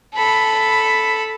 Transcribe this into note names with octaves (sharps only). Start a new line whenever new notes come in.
A4 B5